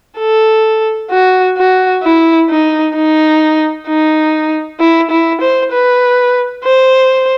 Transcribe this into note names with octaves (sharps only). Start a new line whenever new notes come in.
A4
F#4
F#4
E4
D#4
D#4
D#4
E4
E4
C5
B4
C5